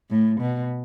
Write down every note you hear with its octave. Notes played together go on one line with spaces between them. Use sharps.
A2
B2